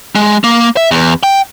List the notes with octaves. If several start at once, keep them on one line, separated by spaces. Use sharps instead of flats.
G#3
A#3
E5
E2
G5